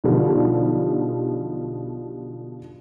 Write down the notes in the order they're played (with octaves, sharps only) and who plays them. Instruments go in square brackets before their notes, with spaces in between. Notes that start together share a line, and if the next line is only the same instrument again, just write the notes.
[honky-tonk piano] B1 B2 D3 F3 G3